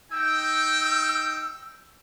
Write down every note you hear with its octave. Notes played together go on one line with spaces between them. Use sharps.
D#4 G5 E6